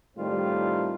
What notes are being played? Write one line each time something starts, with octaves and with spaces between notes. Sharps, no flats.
A2 D#3 G3 A3 C4 F4